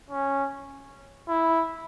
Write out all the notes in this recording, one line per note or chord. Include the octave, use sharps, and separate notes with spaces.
C#4
E4